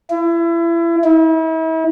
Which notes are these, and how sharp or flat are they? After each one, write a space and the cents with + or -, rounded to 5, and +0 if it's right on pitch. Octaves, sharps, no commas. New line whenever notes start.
E4 +30
E4 -40